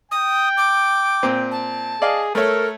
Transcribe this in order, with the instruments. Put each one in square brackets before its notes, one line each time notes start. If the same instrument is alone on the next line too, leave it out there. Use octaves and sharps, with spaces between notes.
[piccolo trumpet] G5 [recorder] D#6
[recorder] D6
[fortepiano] A#2 C4
[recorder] A5
[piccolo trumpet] G#4 [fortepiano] D5 D#5 F5
[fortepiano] A3 C#5 [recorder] A4 [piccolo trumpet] A#4